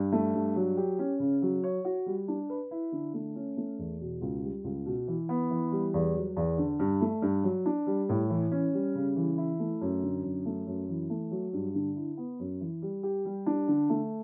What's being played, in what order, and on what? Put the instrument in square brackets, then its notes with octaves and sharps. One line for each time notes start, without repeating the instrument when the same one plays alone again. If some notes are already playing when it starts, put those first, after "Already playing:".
Already playing: [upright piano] G2
A3
G2
F#3
G4
C#4
C#3
F#3
C#5
F#4
G3
D4
B4
E4
D3
A3
C#4
A3
E2
B2
C#2
G3
C#2
B2
E3
B3
E3
G3
E2
F#3
E2
D3
G2
A3
G2
F#3
D4
G3
A2
E3
C#4
G3
C#3
E3
E4
A3
F#2
D3
F#2
A3
F#2
E3
A3
F#3
G2
D3
E4
B3
F#2
E3
G3
G4
G3
D4
D3
A3